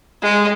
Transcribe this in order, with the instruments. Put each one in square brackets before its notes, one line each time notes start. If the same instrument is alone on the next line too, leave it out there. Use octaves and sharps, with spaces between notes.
[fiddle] G#3